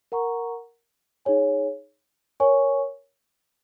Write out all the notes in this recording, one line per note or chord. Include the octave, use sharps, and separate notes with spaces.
A#4 F#5 A#5 C#6
D#4 G#4 C#5 G#5
A#4 C#5 G#5 C#6